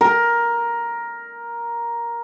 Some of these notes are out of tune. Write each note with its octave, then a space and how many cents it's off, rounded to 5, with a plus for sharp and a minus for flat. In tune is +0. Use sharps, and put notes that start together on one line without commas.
A#4 +10